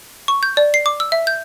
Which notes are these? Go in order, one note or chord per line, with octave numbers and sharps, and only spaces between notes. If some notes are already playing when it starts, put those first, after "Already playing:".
C#6
G6
D5
C7
D6
E6
E5
G6